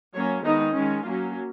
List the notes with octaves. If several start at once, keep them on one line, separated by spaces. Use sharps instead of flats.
F#3 A#3 C#4 C#5
D#3 G#3 B3 D#4
D#3 G#3 C#4
F#3 A#3 C#4 F4